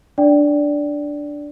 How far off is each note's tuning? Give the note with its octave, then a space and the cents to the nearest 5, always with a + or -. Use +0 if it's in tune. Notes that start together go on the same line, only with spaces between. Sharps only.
D4 +0 D5 -10 G5 +0